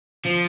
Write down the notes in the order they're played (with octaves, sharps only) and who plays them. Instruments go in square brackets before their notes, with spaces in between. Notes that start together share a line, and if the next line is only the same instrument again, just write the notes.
[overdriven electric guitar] F3